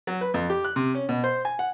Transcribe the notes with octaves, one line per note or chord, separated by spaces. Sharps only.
F#3
B4
F2
G4
F#6
C3
C#4
B2
C5
G#5
F#5